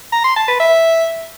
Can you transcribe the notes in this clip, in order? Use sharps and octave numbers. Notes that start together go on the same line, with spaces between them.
A#5
C6
A5
B4
E5